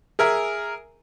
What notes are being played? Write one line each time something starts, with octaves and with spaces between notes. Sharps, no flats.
G#4 A#4 E5 G#5